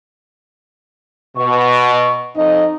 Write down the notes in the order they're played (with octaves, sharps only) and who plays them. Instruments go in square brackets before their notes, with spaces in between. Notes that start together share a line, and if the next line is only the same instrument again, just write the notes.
[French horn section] B2 [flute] C#6
[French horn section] F2 D#5 [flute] D#4